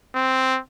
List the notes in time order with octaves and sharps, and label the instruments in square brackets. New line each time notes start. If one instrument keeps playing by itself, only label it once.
[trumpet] C4